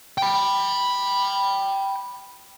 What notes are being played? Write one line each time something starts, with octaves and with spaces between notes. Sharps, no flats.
G5 B5